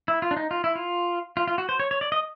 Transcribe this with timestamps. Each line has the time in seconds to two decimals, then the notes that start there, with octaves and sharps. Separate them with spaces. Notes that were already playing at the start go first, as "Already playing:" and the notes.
0.08 E4
0.22 F4
0.31 D4
0.37 D#4
0.51 F4
0.64 E4
0.75 F4
1.37 F4
1.48 F4
1.58 F#4
1.69 C5
1.80 C#5
1.91 C#5
2.01 D5
2.12 D#5